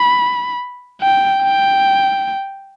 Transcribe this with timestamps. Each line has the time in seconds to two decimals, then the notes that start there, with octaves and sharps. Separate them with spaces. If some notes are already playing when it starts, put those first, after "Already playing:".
Already playing: B5
1.02 G5
1.43 G5